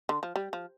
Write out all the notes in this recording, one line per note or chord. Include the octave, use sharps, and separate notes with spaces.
D3
F3
G3
F3